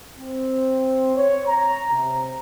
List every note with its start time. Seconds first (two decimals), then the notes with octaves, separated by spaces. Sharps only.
0.19 C4
1.15 C#5
1.46 A#5
1.90 C3